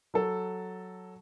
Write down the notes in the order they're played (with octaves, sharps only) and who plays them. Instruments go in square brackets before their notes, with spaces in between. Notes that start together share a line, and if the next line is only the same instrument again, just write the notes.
[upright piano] F#3 A4